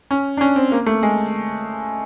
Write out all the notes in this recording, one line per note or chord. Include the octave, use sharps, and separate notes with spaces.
C#4
D4
C#4
C4
A#3
A3
G#3